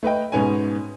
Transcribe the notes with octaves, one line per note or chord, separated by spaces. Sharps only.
A3 B4 D#5 G5
G#2 B2 B3 C#4 G#5